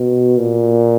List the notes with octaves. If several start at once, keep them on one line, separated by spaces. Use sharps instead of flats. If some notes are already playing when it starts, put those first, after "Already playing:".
Already playing: B2
A#2